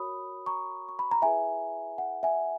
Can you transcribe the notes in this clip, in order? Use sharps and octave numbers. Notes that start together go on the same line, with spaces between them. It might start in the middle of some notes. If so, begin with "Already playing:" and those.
Already playing: F#4 A#4 C#5 B5 D#6
A#5 C#6
C#6
B5
A#5
E4 G#4 B4 E5 G#5
F#5
E5 G#5